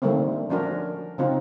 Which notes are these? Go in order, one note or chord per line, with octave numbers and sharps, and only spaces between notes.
D3 D#3 G3 A3 A#3 C4
F3 C#4 D4 F#4 A#4
C#3 C4 D#4 F4